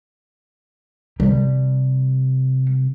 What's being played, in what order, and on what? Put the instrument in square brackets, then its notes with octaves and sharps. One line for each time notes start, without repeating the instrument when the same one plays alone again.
[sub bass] C3 [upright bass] G3